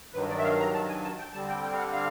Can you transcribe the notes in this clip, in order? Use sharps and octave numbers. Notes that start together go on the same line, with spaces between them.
G2 D#3 F#3 B4
D5
E5
F5
A#5
A5
G#5
A5
G5
D3 G3 C4 A5
G5
G5
F5
F#5
F5